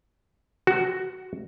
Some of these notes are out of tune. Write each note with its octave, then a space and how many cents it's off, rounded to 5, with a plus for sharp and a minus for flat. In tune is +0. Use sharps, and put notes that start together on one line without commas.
F#4 +10